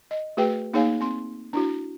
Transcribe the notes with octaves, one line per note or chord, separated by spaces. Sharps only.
D#5
A3 F#4 G#4 B4 G5
A#3 D#4 G#4 C#5 F5 G#5
C4 C6
D4 E4 F#4